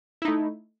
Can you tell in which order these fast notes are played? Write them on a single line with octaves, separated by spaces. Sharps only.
E4 D#4 A3